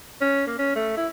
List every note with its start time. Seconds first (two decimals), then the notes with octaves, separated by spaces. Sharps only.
0.21 C#4
0.47 A#3
0.59 C#4
0.75 A3
0.97 E4